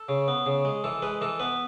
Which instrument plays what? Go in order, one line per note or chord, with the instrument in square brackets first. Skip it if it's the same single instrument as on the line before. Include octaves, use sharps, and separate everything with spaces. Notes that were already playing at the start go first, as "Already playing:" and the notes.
Already playing: [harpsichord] A4
C#3
B3
C#3
G#3
E3 A4
G#3 B4
E3 A4
B3 B4